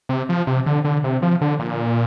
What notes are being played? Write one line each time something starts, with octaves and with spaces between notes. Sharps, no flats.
C3
F3
C3
D3
D3
C3
F3
D3
A#2